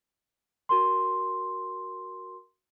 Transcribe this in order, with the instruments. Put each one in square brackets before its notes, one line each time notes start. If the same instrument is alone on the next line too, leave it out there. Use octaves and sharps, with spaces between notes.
[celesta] F#4 A#4 C6